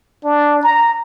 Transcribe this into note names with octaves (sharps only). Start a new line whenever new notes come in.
D4
A#5